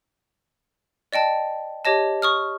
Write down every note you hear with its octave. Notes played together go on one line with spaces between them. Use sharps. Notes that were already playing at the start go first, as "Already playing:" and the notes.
D5 D#5 G5 A5
G4 C#5 D#5 A5
C#6 D#6 F6